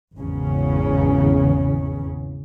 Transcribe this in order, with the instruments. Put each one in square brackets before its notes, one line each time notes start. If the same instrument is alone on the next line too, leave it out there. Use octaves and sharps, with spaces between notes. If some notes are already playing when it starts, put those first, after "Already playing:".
[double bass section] G#1 E2 C#3 C#4